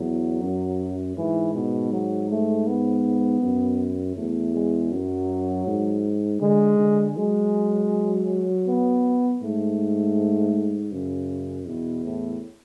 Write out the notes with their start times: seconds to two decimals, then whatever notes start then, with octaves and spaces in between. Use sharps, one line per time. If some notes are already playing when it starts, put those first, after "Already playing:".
Already playing: E2 F#3
0.41 F#2
1.17 G#2 E3
1.55 B2
1.92 F#3
2.30 A3
2.67 B3
3.42 F#2
4.17 E2 A3
4.55 G#3
4.92 F#2 F#3
5.67 G#2
6.41 D3 G#3
6.79 D3
7.17 F#3 G#3
8.67 B3
9.42 G#2 A3
10.92 F#2 C#3
11.67 E2 B2
12.04 A2